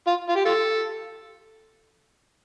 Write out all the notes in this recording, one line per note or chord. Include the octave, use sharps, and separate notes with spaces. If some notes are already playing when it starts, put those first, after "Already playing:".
F4
F4
G4
F4 A4